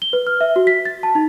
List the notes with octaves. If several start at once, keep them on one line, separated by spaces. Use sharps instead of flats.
G7
B4
F6
E5
F#4
B6
A6
A5
D#4